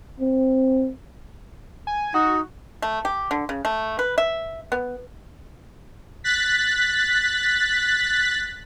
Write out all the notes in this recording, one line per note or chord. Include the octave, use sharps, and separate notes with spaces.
C4
G#5
D#4 F#4
A3
G4
D3
C#3
A3
B4
E5
B3
F#6 A6 B6